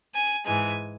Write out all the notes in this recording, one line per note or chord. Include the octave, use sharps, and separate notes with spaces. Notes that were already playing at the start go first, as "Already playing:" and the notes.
G#5
G#2 E3 G#3 G#5